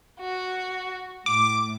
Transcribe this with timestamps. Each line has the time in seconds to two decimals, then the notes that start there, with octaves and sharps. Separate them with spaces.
0.19 F#4
1.26 A2 D6